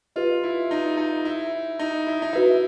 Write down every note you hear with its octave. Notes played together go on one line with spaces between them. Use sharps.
F4 G4 B4 D#5
E4
D#4
D#4
E4
D#4
E4
D#4
E4 F#4 B4 E5